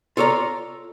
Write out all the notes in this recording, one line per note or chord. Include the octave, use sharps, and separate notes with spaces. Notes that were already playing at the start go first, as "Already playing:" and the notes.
F4 A4 C#5 D5 A#5